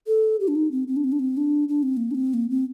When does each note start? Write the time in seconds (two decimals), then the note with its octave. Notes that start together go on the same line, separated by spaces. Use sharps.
0.07 A4
0.40 G4
0.48 D4
0.55 D#4
0.71 C4
0.88 C4
0.96 D4
1.04 C4
1.12 D4
1.19 C4
1.37 D4
1.69 D4
1.83 C4
1.97 A#3
2.11 D4
2.15 C4
2.34 A#3
2.50 C4